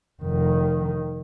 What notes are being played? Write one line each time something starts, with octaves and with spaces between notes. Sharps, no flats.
F1 D#3